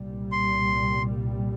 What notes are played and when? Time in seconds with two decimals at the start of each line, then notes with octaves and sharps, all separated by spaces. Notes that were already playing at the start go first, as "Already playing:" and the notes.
Already playing: C2 A#2 G3
0.32 C6